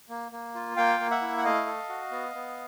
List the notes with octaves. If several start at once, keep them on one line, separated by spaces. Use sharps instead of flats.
A#3
A#3
F4
A#3 F5 G5
A#3
E5 F#5
E4
F#5
A3 D#5 F5
A4
F#4
B3
B3